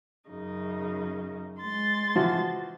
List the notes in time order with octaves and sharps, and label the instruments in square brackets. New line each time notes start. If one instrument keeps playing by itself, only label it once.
[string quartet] F#2 C#3 D#4
G#3 C6 A6
[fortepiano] E3 F3 F#4